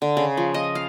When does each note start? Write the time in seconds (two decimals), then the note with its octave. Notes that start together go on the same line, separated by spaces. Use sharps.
0.02 D3
0.17 C#3
0.37 F3
0.54 D#5
0.75 F5